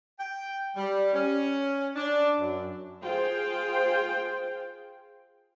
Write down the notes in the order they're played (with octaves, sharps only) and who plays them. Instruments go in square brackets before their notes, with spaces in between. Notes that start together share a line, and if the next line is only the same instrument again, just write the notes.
[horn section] G5
G3
C#4
D4
F#2
[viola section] F4 G#4 C5 G5